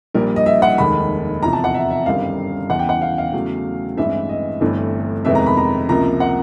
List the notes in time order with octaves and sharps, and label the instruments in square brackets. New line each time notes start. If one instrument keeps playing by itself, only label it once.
[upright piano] A#1 A#2 G3 A#4
D#5
E5
F#5
F1 D#2 D#3 G#3 B5
E2 C3 F3 A#5
A5
F#5
E5
E5
G1 F#2 D#3 G3 C4 F5
E2 C#3 E3 F#5
G5
F#5
F5
F5
E2 C#3 F#3 A3
A1 G2 E3 G#3 C4 E5
D#5
G1 G2 E3 A3 C4
F2 C3 D#3 G#3 B3 E5
A#5
B5
A#5
C#2 C3 F3 A#3 A#5
F#5